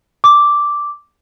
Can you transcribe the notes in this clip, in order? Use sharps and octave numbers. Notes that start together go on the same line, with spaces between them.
D6